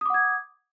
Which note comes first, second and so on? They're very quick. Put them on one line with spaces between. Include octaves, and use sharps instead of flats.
D#6 D6 F#5 G#6